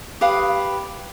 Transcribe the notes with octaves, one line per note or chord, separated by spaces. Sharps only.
G4 B4 F5 D#6